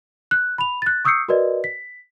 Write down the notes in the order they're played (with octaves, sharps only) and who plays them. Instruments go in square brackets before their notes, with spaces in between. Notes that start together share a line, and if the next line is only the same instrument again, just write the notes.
[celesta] F#6
B5 F7
F#6 A6
C#6 D#6 E6 G6 C7 C#7
F#4 A#4 B4 D5 D#5
B6